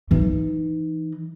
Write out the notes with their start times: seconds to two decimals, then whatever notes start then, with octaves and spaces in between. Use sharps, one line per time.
0.11 E3 D#4